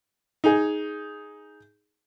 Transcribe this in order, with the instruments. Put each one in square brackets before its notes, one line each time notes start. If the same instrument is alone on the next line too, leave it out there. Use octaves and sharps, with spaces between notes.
[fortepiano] D#4 G#4